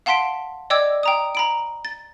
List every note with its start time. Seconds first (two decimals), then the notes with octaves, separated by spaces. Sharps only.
0.06 F5 F#5 A5 C6 B6 D7
0.70 D5 D#5 G5 D6 E6 G#6
1.03 G5 A#5 D#6
1.35 A#5 B5 D7
1.85 A6